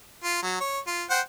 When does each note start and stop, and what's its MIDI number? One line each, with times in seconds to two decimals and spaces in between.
0.24 0.39 65
0.43 0.57 54
0.61 0.79 73
0.87 1.04 65
1.10 1.20 72
1.10 1.20 78
1.10 1.20 79